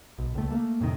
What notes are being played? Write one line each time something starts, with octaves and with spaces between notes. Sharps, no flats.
B1
C#2 A3
A3 A#3
F2 A2 C3 D#3